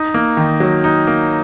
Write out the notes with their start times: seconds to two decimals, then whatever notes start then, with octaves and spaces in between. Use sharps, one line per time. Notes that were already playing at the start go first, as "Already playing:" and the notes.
Already playing: D#4
0.14 A#3
0.37 D#3
0.60 F#3
0.84 D#4
1.07 A#3